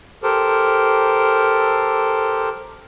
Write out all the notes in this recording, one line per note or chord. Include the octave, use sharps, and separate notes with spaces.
G4 A4 A#4 C5